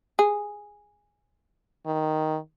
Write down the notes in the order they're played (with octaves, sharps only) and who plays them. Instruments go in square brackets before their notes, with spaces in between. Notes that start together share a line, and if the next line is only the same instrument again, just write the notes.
[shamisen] G#4
[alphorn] D#3